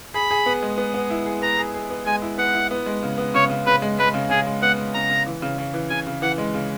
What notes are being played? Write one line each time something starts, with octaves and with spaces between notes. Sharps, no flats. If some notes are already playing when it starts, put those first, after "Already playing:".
G#4 B5
G#4
B3
G#3
B3
B3
E4
G#4
B3 A#5
G#4
G#4
B3
G#3 G#5
E4
B3 F#5
E4
B3
G#3
C#3
B3
C#3 C#5
C#3
C#3 B4
G#3
G#3 B4
C#3
C#3 G#4
G#3
B3 F#5
G#3
C#3 A#5
C#3
E3
C#3
C#3
E3
C#3 G#5
C#3
E3 F#5
G#3
C#3